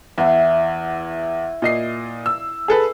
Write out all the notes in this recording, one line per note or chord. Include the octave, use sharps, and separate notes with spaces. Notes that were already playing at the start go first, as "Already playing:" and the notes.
E2 E4 E5 F#5
A#2 D#5 C7
E6
G#4 A4 B4